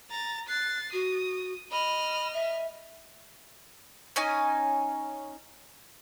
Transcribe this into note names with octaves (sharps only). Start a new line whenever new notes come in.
A#5 A6
F#6 A6 C7
F#4 D#6
D#5 B5 F6
E5
C#4 D#4 G#5